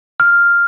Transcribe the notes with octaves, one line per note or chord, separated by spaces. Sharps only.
F6